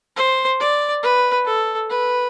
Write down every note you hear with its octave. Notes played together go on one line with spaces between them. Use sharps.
C5
D5
B4
A4
B4